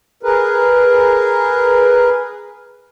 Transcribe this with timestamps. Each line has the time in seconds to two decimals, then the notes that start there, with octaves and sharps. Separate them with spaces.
0.23 G#4 A#4 B4